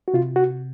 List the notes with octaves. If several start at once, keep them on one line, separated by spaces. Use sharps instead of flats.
F#4
C3 F4
F#4